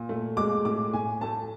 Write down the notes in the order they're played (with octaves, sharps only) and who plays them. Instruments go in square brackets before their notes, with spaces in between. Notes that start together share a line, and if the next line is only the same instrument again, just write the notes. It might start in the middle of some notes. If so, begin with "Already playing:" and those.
Already playing: [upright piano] A#2
A3
G#3 D6
A2 D6
A2 G#5
A3 A5